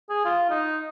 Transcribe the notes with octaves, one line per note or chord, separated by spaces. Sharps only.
G#4
F4
D#4